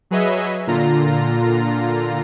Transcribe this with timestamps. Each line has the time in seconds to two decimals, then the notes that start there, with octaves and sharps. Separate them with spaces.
0.11 F#3 G#4 B4 C#5 D#5 E5
0.67 A#2 D3 F4 A#5